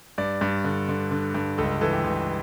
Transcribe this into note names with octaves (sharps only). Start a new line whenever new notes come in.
G2 D5
G2
D3
D3
D3
G2
C#2 A4
E3 A4
G4
C#2